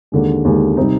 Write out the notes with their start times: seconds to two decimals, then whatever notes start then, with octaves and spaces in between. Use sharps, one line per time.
0.12 D#2 D3 G#3
0.45 D#2 D3 G#3
0.77 C3 G3 C4 D#4